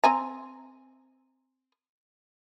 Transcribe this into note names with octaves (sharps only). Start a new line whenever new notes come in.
C4 G#5 A#5